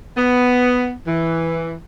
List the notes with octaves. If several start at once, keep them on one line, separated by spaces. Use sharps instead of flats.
B3
E3